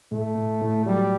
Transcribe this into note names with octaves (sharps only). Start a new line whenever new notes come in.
A2 A3
A2
A2
F#3 G3